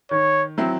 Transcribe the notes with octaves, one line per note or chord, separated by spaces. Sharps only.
D#3 C#5
F#3 C4 E4